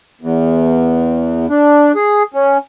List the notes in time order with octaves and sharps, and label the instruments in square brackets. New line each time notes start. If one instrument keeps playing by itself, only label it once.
[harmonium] E2
D4
G#4
C#4